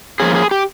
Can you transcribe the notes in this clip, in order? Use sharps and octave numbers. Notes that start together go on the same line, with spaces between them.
F3 A#3 C#4 G#4
G#4
G4